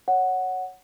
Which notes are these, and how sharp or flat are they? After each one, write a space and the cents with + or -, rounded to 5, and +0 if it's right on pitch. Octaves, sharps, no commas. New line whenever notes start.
C#5 +0 F#5 +0